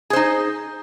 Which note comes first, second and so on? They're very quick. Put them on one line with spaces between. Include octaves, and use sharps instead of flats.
G#4 C5 D#4